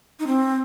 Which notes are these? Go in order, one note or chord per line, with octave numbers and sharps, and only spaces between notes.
D#4
C4